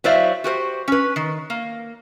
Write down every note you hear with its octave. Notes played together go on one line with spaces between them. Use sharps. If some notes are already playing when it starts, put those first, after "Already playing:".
F#3 E4 C5 D5 E5 F5
F#4 G4 A#4 C5
C#4 B4
D#3
A#3